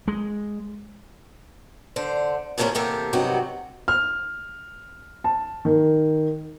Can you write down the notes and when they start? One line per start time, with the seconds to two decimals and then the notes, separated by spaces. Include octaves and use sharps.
0.08 G#3
1.96 D3 C5
2.58 A2 C3 F3 A#3 C#4 F4
2.75 E2 C3 A#3 G4 A4
3.13 G2 C3 D#3 F#3 F#4 G4
3.88 F6
5.24 A5
5.65 D#3